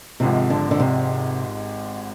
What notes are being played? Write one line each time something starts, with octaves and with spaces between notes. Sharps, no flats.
G#1 G#2 C3 F3
D3
D3
C3